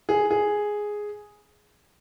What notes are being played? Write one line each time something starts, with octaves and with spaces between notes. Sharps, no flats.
G#4
G#4